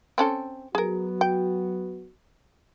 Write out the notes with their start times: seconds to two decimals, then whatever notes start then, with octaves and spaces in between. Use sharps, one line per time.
0.18 C4 C#4 A4
0.75 F#3 B3 F#4 G#4 A#4
1.21 G5